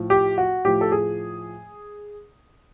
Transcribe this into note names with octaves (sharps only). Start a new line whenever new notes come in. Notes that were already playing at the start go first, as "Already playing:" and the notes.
Already playing: A2 F3
G4
F#4
A2 F3 G4
A4
G#4